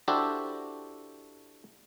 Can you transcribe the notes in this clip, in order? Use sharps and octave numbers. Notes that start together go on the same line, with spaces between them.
D4 E4 F#4 G4 A4 C5